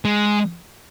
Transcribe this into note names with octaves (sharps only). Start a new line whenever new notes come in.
G#3